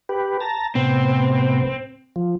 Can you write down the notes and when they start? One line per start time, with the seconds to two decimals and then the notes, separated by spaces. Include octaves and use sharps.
0.09 G4 B4
0.40 A5 A#5
0.75 A2 C3 B3 C4
2.16 F3